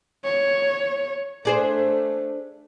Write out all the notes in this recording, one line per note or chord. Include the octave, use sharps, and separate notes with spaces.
C#5
A3 D4 G#4 C5